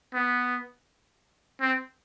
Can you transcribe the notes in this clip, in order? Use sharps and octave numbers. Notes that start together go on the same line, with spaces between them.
B3
C4